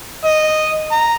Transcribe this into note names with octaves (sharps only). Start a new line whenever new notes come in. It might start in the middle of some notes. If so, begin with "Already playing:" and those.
D#5
A#5